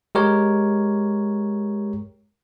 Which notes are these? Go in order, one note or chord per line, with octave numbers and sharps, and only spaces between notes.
G#3 G4 A#4 C#5